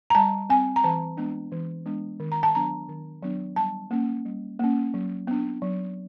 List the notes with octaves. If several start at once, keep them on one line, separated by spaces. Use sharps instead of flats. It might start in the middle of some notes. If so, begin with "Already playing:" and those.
A#5
G3 A5
C4 G#5
A#5
E3 A5
G#3 B3 D4
E3
G#3 B3 D4
D#3
A#5
A5
F#3 B3 D4 A#5
D#3
F#3 B3 D4
G3 A5
A#3 C#4
G3
A#3 C#4
F#3
B3 D4
F#3